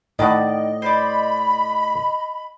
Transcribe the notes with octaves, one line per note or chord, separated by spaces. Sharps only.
A2 D#3 D5 D#5 F#5
C5 D5 B5